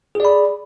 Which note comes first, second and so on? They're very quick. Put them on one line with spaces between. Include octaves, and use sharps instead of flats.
G#4 D5 B5